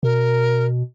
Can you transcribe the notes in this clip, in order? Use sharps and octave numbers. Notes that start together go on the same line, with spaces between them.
B2 A#4